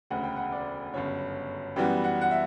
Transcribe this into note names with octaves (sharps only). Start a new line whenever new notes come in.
E1 D2 C#3 F#5
G5
F#5
D5
G1 F#2 C#3 C#5
F#2 E3 G3 B3 G5
F#5
F#5
E5